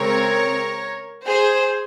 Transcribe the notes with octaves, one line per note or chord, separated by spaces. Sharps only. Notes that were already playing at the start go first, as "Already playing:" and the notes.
Already playing: C#3 G#3 C4 A#4 C#5
G#4 C5